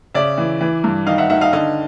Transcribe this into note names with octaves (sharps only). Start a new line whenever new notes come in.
C#3 D5 E5
E3
E3
G2
D#3 D#5 F5
E5 F#5
D#3 E5 F#5
D#5 F5
D3 D#5 F5